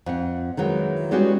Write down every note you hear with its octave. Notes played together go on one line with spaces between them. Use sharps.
F2 F#5
D#3 E3 F#3 G#3
G3 G#3 B3 C#4 F#4 G4